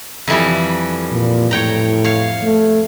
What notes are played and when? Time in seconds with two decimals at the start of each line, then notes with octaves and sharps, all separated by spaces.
0.28 F2 E3 G3
1.12 A#2
1.51 A2 C#5 G5 A#5
2.04 C#5 F5
2.43 A3